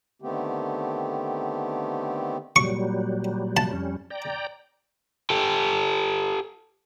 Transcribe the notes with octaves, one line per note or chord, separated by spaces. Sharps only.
D3 D#3 A3 B3 C4 G4
A#2 F#3 G3 C#6
A5
F2 G3 C#4
D5 G5 A#5
G4 A4